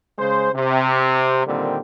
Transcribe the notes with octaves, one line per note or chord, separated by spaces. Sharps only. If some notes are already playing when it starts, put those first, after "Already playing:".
C#3 G#3 C5
C3
A#2 D3 D#3 G3 C4